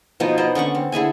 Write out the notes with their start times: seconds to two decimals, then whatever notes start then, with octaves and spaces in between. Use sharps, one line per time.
0.20 B2 F3 D#4
0.38 B3 D#4 C5 D5
0.55 D3 C#4 F#5 C#6
0.75 C4
0.92 D3 E4 G#4 G#5